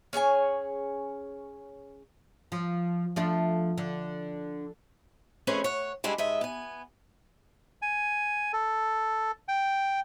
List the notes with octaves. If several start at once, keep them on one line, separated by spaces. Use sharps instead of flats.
C#4 G#4 C#5 G#5
F3
F3 A3 D4
D3
F2 A3 C#4 G#4 B4 C5
C#5 F#5
G3 G#3 D4 E4
G#2 D#5 E5
B3 G#5
G#5
A4
G5